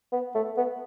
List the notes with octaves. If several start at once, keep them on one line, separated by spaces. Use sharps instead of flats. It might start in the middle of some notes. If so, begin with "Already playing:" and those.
B3
A3
B3